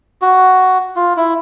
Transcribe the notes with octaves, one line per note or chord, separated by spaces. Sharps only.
F#4
F4
E4